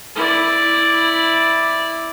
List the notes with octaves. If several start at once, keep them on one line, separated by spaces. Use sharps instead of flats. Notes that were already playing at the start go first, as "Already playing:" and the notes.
E4 D5